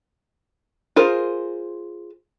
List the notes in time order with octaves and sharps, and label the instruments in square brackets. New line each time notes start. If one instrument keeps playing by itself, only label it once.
[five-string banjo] F4 G#4 A#4 C5